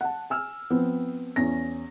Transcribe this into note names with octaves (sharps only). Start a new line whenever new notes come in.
F#5 A5
G#5 E6 F6
F3 B3 C4
E2 C#4 A#6